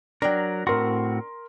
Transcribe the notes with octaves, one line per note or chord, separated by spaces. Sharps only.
F#3 D4 A#4 G5
A2 C4 F#4 A#4 C6